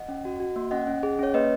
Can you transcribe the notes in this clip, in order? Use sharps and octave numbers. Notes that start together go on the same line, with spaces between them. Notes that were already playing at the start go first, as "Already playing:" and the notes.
Already playing: D#5 F#5
C#4
F#4
F#4
A#3
C#4 D#5 F#5
C#4
G#4
C#4 C#5
A#3 B4 D#5